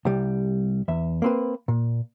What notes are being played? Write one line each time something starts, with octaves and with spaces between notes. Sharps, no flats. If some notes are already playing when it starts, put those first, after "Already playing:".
C2 G3
E2 E5
A#3 C4 B4
A#2